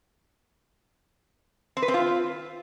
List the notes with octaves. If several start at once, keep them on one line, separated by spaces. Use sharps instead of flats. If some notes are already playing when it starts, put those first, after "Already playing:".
C4
B4
C4
F4